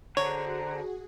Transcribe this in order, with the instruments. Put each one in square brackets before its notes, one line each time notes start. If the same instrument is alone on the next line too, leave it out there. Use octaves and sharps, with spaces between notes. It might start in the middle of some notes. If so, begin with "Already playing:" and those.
[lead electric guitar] D3 [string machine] F#4 G#4 [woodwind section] C5 A#5 [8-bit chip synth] C#5